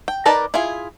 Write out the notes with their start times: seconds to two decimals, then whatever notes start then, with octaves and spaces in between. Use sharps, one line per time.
0.08 G5
0.26 D#4 A#4 B4 D5 A5
0.54 E4 F4 G#4